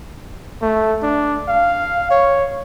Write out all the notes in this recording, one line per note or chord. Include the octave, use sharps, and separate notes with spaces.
A3
D4
F5
C#5